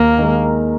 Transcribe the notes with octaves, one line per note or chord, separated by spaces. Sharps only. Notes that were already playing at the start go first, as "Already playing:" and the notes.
Already playing: D#2 A#3
D#3 G#3